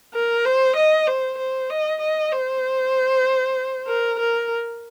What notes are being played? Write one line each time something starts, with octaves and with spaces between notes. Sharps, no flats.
A#4
C5
D#5
C5
C5
D#5
D#5
C5
A#4
A#4